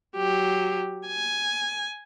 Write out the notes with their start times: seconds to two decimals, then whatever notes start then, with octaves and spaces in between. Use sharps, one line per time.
0.16 F#3 G4
1.07 G#5